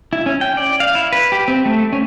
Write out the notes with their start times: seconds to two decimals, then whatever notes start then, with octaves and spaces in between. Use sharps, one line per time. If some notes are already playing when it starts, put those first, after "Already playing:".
0.13 E4
0.26 C#4
0.41 G5
0.57 D5
0.80 F5
0.95 E4
1.12 B4
1.32 G4
1.48 C4
1.66 A3
1.93 C#4